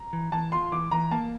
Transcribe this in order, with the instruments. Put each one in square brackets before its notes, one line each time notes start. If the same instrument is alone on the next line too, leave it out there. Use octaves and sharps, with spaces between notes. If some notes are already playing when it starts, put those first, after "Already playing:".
Already playing: [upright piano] A#5
[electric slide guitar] E3
[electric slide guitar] E3 [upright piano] A5
[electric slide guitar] F4 [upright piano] C6
[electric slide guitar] E3 [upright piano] D6
[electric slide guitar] E3 [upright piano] A#5
[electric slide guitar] A#3 [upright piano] A5